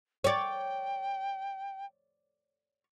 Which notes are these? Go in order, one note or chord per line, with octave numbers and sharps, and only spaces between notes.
C#5 D5 G5